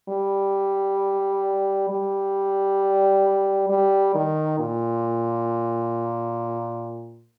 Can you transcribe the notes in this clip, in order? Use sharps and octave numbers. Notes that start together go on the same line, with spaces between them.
G3
G3
G3
D#3
A#2